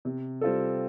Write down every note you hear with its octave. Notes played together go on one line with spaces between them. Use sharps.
C3
G3 C4 F4 A4